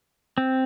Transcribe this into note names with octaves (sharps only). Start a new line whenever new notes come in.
C4